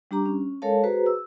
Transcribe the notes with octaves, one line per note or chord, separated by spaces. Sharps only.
G3 D4 G4 A#5 D6
C#4
G#3 A4 A#4 C#5 F5 A5
F#4 G#4 B4 C5 A#5
E6